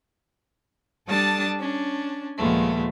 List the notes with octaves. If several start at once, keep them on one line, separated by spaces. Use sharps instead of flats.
G3 D4 A4 A5 D#6 A6
C#4 D4
D#2 A#2 F3 G#3 A3 B3